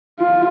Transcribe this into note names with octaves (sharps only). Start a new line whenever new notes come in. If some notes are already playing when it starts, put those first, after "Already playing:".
F4